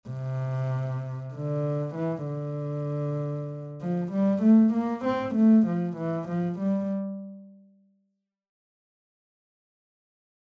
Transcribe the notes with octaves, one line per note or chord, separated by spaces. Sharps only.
C3
D3
E3
D3
F3
G3
A3
A#3
C4
A3
F3
E3
F3
G3